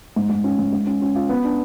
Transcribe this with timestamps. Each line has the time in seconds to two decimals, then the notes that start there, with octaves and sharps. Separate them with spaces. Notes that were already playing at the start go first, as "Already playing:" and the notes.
0.16 G#2
0.30 G#2
0.44 C#4
0.59 G#2
0.73 G#2
0.87 C#4
1.02 C#4
1.16 F4
1.29 B3
1.44 D4